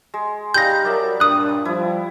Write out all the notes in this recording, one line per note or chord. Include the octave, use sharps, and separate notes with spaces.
G#3
G3 D#4 F5 G6 A#6
F#3 F#4 A#4 D5 E5 A5
G2 A#2 D4 D#6 F#6
F3 G3 E4